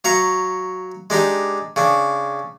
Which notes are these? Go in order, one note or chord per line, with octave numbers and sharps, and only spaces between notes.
F#3 F5 A#5 C#6
G#3 D4 D#4 G4
C#3 D4